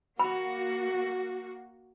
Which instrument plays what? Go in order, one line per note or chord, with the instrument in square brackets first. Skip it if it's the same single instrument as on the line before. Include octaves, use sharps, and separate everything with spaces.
[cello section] A#3 F#4 [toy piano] B5